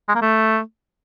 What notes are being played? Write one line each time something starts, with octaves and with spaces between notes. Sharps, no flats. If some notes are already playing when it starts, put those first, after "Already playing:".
G#3
A#3
A3